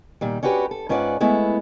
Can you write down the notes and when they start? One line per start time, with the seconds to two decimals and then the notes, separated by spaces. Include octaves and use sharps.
0.21 A#2 D#3 G3
0.43 C#4 D4 F#4 G4 B4
0.71 A4
0.89 G#2 C#4 F4 B4 D5 F#5
1.20 G#3 A3 B3 E4